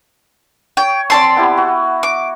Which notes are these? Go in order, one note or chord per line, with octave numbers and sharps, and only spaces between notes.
C#5 G5
C4 D5 A5 C6
B3 E4 G4
F#4
D6